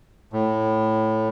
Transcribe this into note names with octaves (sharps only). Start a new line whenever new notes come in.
A2